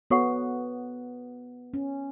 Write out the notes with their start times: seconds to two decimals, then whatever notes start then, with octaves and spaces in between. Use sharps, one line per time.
0.11 B3 F#4 A4 C#5 F#5 C#6
1.74 C#4